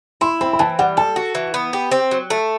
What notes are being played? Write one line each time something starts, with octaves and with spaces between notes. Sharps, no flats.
E4 C6
C4 B5
B5
E3 A5
G3 F#5
A4 A5
F#4
E3
B3
G4
C4
F#3
A3